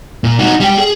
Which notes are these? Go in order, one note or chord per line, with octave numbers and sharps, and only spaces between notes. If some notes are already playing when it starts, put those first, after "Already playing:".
A#2
D#4 F#4
G3 G5
G#4